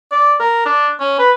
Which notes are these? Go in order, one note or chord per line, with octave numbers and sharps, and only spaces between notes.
D5
A#4
D4
C#4
B4